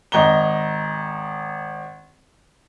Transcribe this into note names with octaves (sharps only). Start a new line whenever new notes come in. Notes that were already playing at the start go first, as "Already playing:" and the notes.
G#1 D#5 A#5 G7